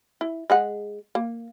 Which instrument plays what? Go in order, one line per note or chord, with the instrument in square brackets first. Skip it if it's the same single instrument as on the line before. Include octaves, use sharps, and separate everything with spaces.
[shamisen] E4
G#3 G#4 F#5
A#3